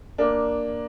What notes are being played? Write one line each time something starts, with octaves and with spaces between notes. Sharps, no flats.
A#3 D4